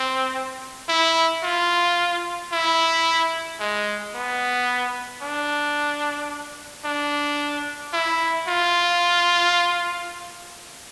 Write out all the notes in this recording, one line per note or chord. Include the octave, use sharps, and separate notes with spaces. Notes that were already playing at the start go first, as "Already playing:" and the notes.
Already playing: C4
E4
F4
E4
G#3
B3
D4
D4
E4
F4